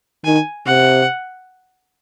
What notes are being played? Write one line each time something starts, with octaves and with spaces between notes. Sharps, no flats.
D#3 G#5
C3 F#5